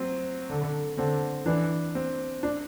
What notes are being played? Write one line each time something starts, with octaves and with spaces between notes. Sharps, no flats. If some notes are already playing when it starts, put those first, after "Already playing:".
Already playing: F#3 C4
D3
D3 C4
E3 D4
C4
D4